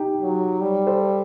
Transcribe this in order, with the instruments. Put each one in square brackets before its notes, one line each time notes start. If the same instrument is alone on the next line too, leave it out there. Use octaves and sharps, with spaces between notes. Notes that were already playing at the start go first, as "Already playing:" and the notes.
Already playing: [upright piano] D#4 G4
[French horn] F#3
G3
[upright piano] A4 C5